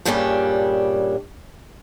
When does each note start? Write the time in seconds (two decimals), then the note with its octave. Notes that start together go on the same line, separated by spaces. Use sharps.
0.05 G2 A#2 C#3 G3 C#4 D4